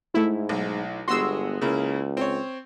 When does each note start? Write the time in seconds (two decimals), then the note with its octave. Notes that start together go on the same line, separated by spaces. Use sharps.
0.14 G#2 A3 E4
0.49 B1
1.08 G1 G#3 B3 F#4 C6 E6
1.61 C#2 C#3 A#3 E4
2.17 C4 C#5